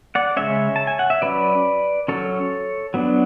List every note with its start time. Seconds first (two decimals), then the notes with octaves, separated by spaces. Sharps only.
0.15 D5 F#5
0.36 C#3 G#3 C#4 C#5 E5
0.76 A5
0.87 G#5
0.99 F#5
1.10 E5
1.22 F#3 C#4 B4 D5
2.08 F#3 C#4 A4 C#5
2.94 F#3 B3 D4